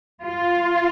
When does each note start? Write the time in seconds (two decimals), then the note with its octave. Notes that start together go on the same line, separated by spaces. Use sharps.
0.24 F4